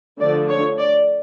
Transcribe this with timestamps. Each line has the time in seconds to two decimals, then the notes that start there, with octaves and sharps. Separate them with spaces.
0.20 D3 F3 A3 D4 D5
0.49 C#5
0.78 D5